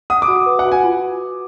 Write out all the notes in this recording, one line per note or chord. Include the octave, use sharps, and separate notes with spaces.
F#5 D#6
D6
F#4
B4
F#5
F#4
G#5
F4